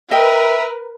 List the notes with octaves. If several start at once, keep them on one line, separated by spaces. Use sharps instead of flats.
A#4 B4 D#5 E5 G5